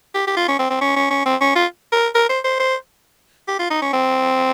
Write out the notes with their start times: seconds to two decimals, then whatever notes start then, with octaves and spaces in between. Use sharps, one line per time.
0.14 G4
0.27 G4
0.37 F4
0.48 C#4
0.59 C4
0.70 C4
0.81 C#4
0.96 C#4
1.10 C#4
1.25 C4
1.41 C#4
1.55 F4
1.92 A#4
2.15 A#4
2.29 C5
2.44 C5
2.59 C5
3.48 G4
3.59 F4
3.70 D#4
3.82 C#4
3.93 C4